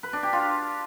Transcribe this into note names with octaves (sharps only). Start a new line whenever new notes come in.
B4
D4
G4
F4